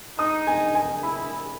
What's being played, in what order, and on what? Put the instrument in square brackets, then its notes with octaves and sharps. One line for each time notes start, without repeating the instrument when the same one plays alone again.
[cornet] D#4 [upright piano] D#6
[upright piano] G#5
G#5
[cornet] E4 [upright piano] B5